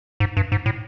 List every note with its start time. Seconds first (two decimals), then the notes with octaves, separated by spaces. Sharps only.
0.20 G#2
0.37 G2
0.52 G#2
0.66 A2